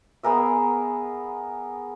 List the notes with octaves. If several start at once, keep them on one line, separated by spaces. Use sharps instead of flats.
B3 G#4 A#4 E5